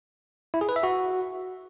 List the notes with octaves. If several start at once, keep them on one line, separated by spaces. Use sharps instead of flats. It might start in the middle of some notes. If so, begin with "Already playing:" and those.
E4
G#4
B4
E5
F#4